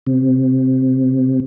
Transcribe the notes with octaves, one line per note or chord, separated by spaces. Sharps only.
C3